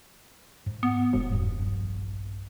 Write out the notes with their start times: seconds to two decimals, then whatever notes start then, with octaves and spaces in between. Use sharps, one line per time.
0.66 G#2
0.83 B3
1.13 E1 G#2
1.32 E2 G2 G3
1.59 A#1 G2